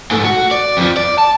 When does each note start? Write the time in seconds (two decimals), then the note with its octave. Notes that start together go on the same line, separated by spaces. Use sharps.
0.11 G#2 A3
0.25 F#4
0.51 D5
0.77 F2 F3
0.97 D5
1.18 A5